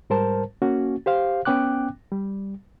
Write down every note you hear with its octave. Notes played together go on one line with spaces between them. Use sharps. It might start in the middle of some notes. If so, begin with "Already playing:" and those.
G#2 G3 A#4 C5 A5
A#3 C#4 F#4
G4 C5 F5
B3 C#4 G5 D6 F#6
G3